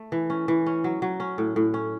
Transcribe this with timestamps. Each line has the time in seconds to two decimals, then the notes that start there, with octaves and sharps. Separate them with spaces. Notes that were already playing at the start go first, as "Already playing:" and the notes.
Already playing: A3
0.12 E3
0.30 C#4
0.48 E3
0.66 C#4
0.84 F#3
1.02 F#3
1.20 C#4
1.38 A2
1.56 A2
1.74 C#4